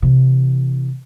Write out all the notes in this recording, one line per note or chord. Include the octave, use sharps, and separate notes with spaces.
C3 E3